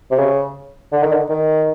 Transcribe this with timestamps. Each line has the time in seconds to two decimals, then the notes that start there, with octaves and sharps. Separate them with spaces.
0.11 C3
0.19 C#3
0.92 D3
1.03 D#3
1.12 D3
1.30 D#3